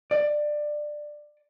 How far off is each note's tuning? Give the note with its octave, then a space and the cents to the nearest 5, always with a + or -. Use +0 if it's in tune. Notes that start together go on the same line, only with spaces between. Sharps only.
D5 +15